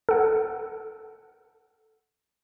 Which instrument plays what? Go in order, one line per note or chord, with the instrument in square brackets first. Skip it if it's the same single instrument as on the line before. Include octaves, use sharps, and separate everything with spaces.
[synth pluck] A4 F#5